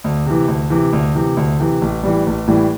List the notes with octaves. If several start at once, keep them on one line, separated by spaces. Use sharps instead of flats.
D2
C3 E3
D2
C3 E3
D2
C3 E3
D2
C3 E3
A1
A2 E3 G3
A1
A2 E3 G3